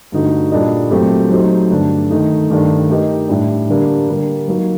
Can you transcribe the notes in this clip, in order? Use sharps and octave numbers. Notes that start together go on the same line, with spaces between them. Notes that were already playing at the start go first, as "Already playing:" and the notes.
G2 D3 A3 D#4 F#4
A#2 G3 D4 A4 D#5
A#2 F#3 A3 C4 G4
F#3 A3 D#4 G4 C5
G2 D3 A3 D4
D#3 A3 D#4
G2 D#3 A3 D4
A3 D#4 G4 A#4 D#5
A2 G3 D4
D3 G3 A#3 D4 G4
D3 G3 A#3
F#3 A#3 D#4 F#4